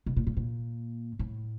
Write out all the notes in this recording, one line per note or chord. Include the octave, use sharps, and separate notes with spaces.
B2
A#2
A#2
A#2
A2